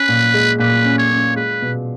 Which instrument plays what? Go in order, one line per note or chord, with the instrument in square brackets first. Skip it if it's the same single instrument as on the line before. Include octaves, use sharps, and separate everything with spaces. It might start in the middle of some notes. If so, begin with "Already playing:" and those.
Already playing: [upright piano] C#4 [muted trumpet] B4
[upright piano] A#2
G#3
[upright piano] A#2 [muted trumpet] B4
[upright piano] C#4
[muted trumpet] C#5
[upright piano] C#4
[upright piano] G#3 [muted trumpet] B4
[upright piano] B2